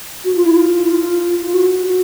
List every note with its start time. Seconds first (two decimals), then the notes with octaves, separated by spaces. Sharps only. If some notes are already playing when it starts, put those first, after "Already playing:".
0.25 F#4
0.36 F4
0.46 E4
0.56 F4
0.85 E4
0.90 F4
1.46 F4
1.54 F#4
1.87 F#4